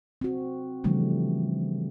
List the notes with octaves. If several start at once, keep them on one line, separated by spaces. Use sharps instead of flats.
C4 F#4
C#3 E3 F3 G3 A3 D4